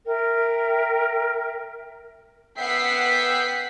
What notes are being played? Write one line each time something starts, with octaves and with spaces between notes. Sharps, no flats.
A#4 E5 G5
B3 E5 F#5 G5 B6 C7